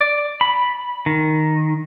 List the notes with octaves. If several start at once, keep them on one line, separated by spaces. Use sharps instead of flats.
D5
B5
D#3